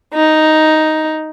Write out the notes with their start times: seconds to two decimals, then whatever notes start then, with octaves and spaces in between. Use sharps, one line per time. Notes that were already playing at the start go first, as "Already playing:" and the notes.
0.15 D#4